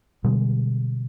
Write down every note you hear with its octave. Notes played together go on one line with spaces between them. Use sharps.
B2 D3 G3 G#3